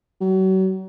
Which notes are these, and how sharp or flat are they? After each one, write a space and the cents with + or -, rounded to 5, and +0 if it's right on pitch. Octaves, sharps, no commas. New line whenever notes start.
F#3 +35